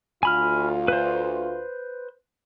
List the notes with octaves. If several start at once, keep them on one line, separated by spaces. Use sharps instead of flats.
D2 F4 G#5 B5 F6
B4 C5